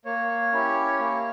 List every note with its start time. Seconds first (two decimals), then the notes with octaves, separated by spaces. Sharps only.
0.05 A#3 C#5
0.53 C#4 E4 G4
0.99 A#3